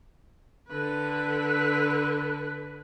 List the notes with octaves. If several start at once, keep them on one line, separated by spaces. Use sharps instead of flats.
D3 B4